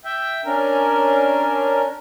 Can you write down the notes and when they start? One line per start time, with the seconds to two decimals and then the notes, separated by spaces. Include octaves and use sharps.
0.05 E5 G5
0.45 C#4 D4 A#4